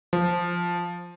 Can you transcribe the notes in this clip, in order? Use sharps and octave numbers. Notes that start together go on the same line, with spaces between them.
F3